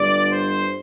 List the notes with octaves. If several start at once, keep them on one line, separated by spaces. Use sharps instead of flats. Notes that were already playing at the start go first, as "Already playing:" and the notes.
Already playing: G1 G2 D3 D5
C5